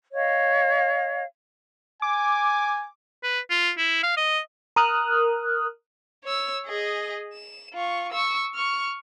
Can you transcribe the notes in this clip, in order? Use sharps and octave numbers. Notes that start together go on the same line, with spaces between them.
C#5 D#5 F5
G#5 D6
B4
F4
E4
F5
D#5
A#4 D#6 F6 F#6
C#5 E6
G#4 D#5
E7
F4 C#6
C#6 E6
C#6 F6